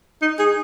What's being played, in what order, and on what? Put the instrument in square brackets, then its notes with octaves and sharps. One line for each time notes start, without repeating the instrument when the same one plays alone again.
[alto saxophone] D#4
G#4